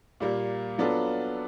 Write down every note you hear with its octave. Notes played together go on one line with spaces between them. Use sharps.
A#2 G3 A#3
F#3 B3 D4 F4 A4